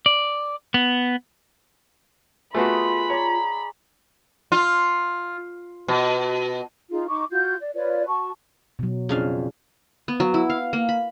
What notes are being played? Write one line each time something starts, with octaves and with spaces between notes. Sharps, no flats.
D5
B3
A3 B3 F4 F#4 G#4 D#5 B5 C6
C#5 D5 A#5
F4
B2
D#4 F4 G#4
D#4 C#6 D6
F4 F#4 G6
D5
F4 B4 C#5 D5
F#4 A5 C#6
B2 F#3
F2 C#3 D4 F5
B3
F#3
E4
F5
A#3
B5